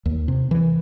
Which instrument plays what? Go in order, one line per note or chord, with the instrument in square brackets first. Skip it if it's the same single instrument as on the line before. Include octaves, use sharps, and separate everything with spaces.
[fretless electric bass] D#2
C3
E3